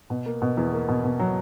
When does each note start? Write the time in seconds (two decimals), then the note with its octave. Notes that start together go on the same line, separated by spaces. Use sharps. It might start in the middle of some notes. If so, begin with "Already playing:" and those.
0.10 B2
0.26 A#3
0.42 B2
0.57 E2
0.73 A#3
0.89 B2
1.04 B2
1.20 F#3